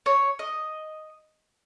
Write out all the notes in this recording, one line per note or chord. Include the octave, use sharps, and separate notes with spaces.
C#5
D#5